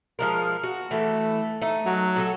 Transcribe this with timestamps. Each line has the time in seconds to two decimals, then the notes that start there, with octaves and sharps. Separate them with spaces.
0.19 F3 G#3 A#4
0.63 F#4
0.91 E3 A3
1.62 A3 D#4
1.86 F#3
2.16 F#4 G#4 A4